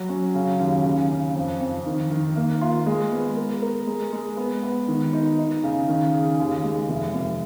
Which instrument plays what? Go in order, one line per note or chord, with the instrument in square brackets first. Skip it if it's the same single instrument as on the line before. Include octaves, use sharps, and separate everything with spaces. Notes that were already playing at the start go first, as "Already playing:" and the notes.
Already playing: [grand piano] F#3
C#4
C#3
D#2
C#3
C#3
F2
F2
D#3
D#3
A#3
F4
G#3
B3
A#4
A#4
G#3
G#3
B3
B3
D#3
D#4
D#4
C#3
D#3
G#4
D#2
G#3
F1
F1